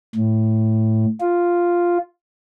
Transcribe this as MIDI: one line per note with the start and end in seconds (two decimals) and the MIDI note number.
0.15 1.06 45
1.21 1.98 65